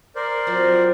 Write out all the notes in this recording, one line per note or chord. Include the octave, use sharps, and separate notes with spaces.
A#4 C5 D5
F#3 C4 F4